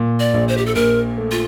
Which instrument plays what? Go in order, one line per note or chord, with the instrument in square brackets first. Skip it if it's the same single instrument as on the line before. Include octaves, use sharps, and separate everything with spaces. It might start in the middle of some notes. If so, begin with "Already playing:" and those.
Already playing: [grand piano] A#2
[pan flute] D5
[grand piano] A#1
[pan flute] C5
G4
A4
[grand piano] A#1 [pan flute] A#4
[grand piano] A3
[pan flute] F4